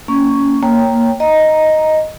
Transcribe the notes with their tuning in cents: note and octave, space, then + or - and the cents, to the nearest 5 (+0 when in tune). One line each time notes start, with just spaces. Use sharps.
A#3 -10 C#4 +15 C#6 +5
A#3 +0 C#5 +0 G5 +0
D#5 +0 A#5 +0